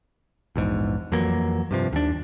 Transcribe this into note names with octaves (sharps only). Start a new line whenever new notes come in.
A#1 E2 G#2
F2 E3 F#3 A#3
G2 C3 F3
D#2 D4